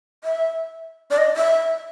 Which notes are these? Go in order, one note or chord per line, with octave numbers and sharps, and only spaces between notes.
E5
D5
D#5
E5